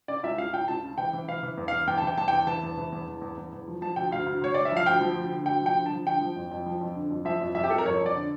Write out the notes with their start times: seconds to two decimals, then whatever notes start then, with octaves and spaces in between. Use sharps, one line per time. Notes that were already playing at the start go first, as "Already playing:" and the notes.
0.08 C#3 D5
0.23 C#2 E5
0.38 C#2 F5
0.53 C#2 G5
0.68 C#2 A5
0.83 C#3
0.98 E3 G5
1.13 E3
1.28 E3 F5
1.43 E3
1.57 E2
1.68 E2 F5
1.87 E2 G5
1.98 E3 A5
2.07 G5
2.18 E2 A5
2.28 E2 G5
2.47 E3 A5
2.63 E2
2.77 E3
2.92 E2
3.08 E2
3.22 E2
3.37 E2
3.52 E2
3.68 F3
3.81 F3 A5
3.96 D2 G5
4.11 D2 F5
4.26 D2
4.42 D2 C#5
4.54 D2 D5
4.65 E5
4.72 F3 F5
4.86 D2 G5
5.01 F3
5.17 D2
5.32 D3
5.46 D2 G5
5.62 F3 G5
5.76 D3
5.86 F3 A5
6.06 D3 G5
6.21 F3
6.36 F2
6.51 F2
6.66 F3
6.81 F2
6.95 D3
7.11 F2
7.25 F3 E5
7.41 F2
7.55 F2 E5
7.64 G4
7.70 F2 A4
7.78 A#4
7.85 F2 C#5
8.01 F2
8.06 D5
8.16 D3